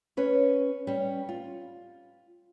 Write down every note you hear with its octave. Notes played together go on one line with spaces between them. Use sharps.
C#4 B4 C#5
G3 C#4
F4